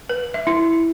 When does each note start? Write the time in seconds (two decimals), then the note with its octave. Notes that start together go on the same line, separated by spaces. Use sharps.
0.09 B4
0.34 E5
0.47 E4